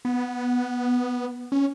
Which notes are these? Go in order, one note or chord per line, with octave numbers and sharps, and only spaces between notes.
B3
C#4